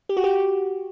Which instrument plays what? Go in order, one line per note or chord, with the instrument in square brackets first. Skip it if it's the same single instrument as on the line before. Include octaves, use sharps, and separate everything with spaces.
[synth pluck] G4
F#4
G4